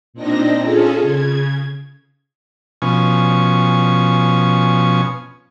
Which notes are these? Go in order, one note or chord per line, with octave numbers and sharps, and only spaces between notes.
A#2 C4 D4 D#4 A#6
C#4 F4 G#4 A4
C#3 G#6
B2 F3 C#4 G#5